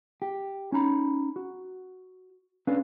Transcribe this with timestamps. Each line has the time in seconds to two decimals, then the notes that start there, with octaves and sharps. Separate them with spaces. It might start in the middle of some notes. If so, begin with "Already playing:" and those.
0.22 G4
0.72 C#4 D#4 A#5 B5
1.36 F#4
2.67 C#4 D4 A4 B4 D5 F5